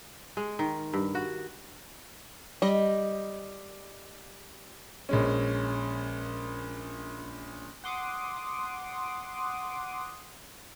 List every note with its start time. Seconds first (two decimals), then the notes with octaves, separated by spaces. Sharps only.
0.37 G#3
0.59 D#3
0.94 G2
1.15 F#4
2.62 G3 D#5
5.09 A#1 G#3 C#4
7.84 F#5 C6 D6 D#6